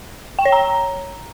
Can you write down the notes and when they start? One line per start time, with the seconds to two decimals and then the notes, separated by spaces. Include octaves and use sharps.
0.39 G5
0.45 C#5
0.52 A#5